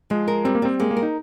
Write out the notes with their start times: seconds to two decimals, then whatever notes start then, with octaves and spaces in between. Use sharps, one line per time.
0.10 F3 G#3
0.28 A#4
0.45 G3 C4
0.55 A#3
0.62 G3 C4
0.80 G#3 A#3
0.91 A#3
0.97 A#4
1.03 D#4